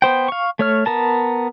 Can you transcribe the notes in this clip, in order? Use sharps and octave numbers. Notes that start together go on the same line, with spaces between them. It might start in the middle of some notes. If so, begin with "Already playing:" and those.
B3 C5 G5
F5 C#6
A3 C#5 F6
B3 A#4 A5